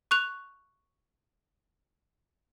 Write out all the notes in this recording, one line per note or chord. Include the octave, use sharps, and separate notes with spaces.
C#6 F#6 F7